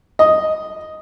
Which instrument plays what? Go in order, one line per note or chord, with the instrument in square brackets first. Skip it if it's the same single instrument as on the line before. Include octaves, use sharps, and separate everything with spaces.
[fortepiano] D#5